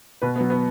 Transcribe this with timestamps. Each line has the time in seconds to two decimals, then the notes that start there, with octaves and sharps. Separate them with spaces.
0.22 B2 B4
0.36 B3
0.41 F#3
0.50 B3